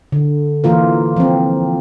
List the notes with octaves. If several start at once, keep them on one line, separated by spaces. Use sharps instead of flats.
D3
E3 A#3 F4 A#4
F3 C4